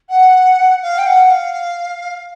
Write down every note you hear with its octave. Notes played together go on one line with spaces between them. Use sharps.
F#5
F5
G5
F#5
F5